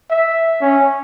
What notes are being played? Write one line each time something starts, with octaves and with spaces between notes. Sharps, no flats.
E5
C#4